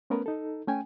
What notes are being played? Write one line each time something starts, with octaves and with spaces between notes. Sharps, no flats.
A3 B3 C#4 A#4 B4
D#4 A4
A3 C#4 G5 G#5